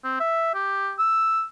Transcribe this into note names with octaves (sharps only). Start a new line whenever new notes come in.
C4
E5
G4
E6